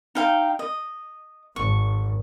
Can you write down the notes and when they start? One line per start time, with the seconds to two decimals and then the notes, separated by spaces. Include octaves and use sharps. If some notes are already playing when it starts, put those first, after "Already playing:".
0.15 D#4 F5 G5
0.59 D#5
1.56 G#1 C#6